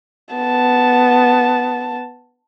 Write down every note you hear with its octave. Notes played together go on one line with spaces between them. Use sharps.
B3 A5